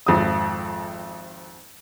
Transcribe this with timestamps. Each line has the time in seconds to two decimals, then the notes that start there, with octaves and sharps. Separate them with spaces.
0.06 G#1 F2 D#6